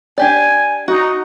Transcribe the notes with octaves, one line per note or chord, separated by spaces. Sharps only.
D4 G4 D5 G#5
D#4 F#4